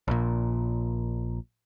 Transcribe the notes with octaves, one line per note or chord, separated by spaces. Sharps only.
A#1 A#2